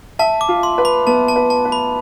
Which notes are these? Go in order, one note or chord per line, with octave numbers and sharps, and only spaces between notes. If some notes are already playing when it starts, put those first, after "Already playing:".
E5 A5
D6
F4
C6
B4
B5
B3 A5
A5
B4
A5
B4
B5